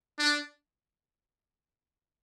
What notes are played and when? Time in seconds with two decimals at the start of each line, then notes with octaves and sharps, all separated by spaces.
0.19 D4